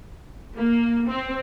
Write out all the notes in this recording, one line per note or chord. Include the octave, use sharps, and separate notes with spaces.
A#3
C4